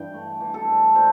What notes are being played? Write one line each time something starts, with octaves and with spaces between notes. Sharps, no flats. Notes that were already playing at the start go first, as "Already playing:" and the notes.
Already playing: G2 E3 G5
A3
E3
A4
G2
G3 C5